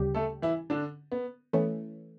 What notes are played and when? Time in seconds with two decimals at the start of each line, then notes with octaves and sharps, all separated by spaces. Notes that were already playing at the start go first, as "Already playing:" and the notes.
Already playing: D2 C#3 G3 G4
0.15 A3 A4
0.42 E3 E4
0.70 D3 D4
1.12 B3
1.53 E3 A3 B3 C#4